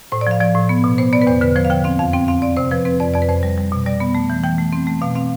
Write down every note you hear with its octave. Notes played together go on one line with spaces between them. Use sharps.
A2 C5
D5
F3 F5
F3 D5
A2
B3
B2
B3 C5
B3 D5
B4
E2 C5
D3 B4
F3 C5
F5
D3 G5
C4 F5
F2 F5
C4 G5
C4 F5
C4 D5
C3 C5
F3 B4
C4 B4
F2 D5
F2 D5
B4
F2 C5
G3
G3
B2
G3 D5
B3
A3
E3
E3 G5
A3
C4
A3
B2 F5
C4 F5